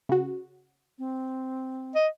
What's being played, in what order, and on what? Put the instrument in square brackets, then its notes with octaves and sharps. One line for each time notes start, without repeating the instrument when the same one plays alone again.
[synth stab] C#3 F#4
[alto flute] C4
[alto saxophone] D#5